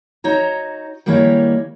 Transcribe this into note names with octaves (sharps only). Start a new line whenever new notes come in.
D#4 F#4 C#5 A#5
D#3 G3 G#3 A#3 E4 C#5